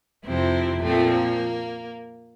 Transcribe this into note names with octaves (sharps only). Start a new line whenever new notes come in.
F2 C3 F3 C4 E4
A#2 F3 A3 C4
A#3